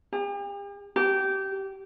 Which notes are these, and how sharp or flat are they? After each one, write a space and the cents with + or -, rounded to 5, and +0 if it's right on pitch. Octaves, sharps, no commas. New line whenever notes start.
G4 +45
G4 -20